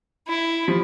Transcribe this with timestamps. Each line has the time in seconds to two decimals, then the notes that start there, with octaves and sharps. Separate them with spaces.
0.28 E4
0.68 F3 G3